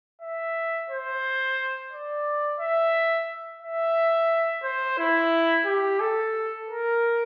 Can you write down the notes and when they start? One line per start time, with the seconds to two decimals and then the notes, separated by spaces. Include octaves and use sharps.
0.22 E5
0.90 C5
1.92 D5
2.60 E5
3.62 E5
4.64 C5
4.99 E4
5.66 G4
6.00 A4
6.69 A#4